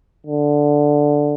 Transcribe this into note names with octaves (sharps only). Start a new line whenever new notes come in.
D3